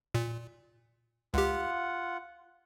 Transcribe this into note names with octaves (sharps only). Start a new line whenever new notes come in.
A#2
C#2 F4 G4 F#5